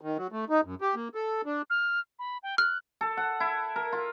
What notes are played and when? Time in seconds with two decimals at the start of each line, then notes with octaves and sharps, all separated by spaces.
0.01 D#3
0.18 F#3
0.32 A3
0.50 D#4
0.65 F#2
0.81 G4
0.95 A#3
1.15 A4
1.46 D4
1.70 F6
2.19 B5
2.43 G5
2.58 F6 F#6
3.01 A4
3.17 F#5
3.40 E4
3.76 A#4
3.93 F4